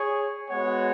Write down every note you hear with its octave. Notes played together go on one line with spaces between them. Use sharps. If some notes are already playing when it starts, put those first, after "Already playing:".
Already playing: G#4 C#5
G#3 B3 F#4 C#5 F#5